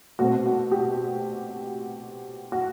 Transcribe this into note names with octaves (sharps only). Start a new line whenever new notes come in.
B2 A3 C4 F#4
F#4
G4
F#4